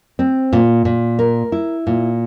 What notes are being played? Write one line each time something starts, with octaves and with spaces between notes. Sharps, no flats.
C4
A#2
A#2
A#4
E4
A#2